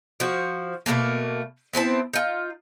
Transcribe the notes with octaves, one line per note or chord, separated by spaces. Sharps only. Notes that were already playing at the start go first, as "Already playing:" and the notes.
F3 F#4
B2 G3 A3 A#3
B3 C4 E4 A5
D#4 F4